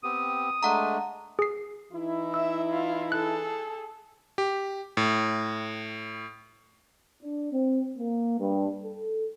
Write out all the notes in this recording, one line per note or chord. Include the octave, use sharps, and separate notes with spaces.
B3 C4 G4 D#6
G#3 A3 D4 F#5 A#5
G#4 C7
E3 D#4 E4
E5 E6
F4
G#4 A4 F#6
G4
A2
D4
C4
A#3
G2
A4